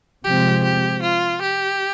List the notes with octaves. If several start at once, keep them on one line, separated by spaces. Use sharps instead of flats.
C3 F3 G#3 C4 G4
G4
F4
G4